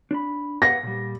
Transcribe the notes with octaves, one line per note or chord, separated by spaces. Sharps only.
D4 B5
B4 F5 F#5 A#6
A#2 G3